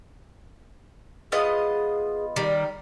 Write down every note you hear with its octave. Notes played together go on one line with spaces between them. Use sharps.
B3 F4 G#4 D#5
D#3 G3 D5